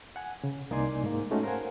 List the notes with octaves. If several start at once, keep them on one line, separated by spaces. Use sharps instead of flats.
F#5 G#5
C#3
C2 A#3 D#4 D5 G#5 C6
G#2 A#3
G#3 A3 C#4 D#4 F#4
A#4 C5 F5 F#5 G#5